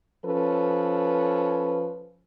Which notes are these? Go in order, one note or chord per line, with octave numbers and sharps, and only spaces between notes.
F3 C#4 A4 B4